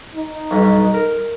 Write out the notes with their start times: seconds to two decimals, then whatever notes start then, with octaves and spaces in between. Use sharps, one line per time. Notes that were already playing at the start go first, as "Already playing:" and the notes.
0.15 D#4
0.51 B1 G2
0.94 A#4